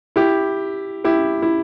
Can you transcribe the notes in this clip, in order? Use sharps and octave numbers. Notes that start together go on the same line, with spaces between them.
E4 G4
E4 G4
E4